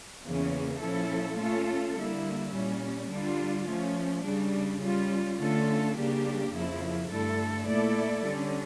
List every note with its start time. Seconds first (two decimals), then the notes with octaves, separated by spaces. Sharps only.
0.24 E2 C#3 E3 A#3 C#4
0.81 A#2 F3 C#4 E4 A4
1.39 A3 C#4 F4 A4
1.96 D3 G3 A#3 E4
2.53 A#2 G3 C#4
3.10 D3 G3 D4 F4
3.67 F3 A3 C#4
4.24 C#3 G3 D4
4.81 G3 C#4 F4
5.38 D3 A3 C#4 F4 A4
5.96 C#3 G3 A#3 D4 G4
6.53 F2 C#3 F3 A#3 E4
7.10 G2 D3 A3 E4 A4
7.67 A#2 A3 E4 A4 D5
8.24 D3 G3 C#4